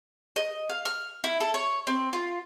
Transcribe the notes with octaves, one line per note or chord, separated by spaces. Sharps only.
D#5
F5
F6
E4
A4
C#5
C4
F4